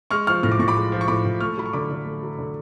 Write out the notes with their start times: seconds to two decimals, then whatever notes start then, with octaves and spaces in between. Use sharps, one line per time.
0.11 G#3 C#6 F6
0.27 F3 C#6 F6
0.43 A2 F6
0.52 D6
0.59 A2 C#6
0.68 B5 D6
0.76 G#3
0.92 F3
1.01 C#6
1.08 A2 B5 D6
1.25 A2
1.40 A3 C#6 F6
1.57 F#3 B5
1.66 C#6
1.73 D3 B5 D6
1.90 D3
2.05 A3
2.23 F#3
2.39 D3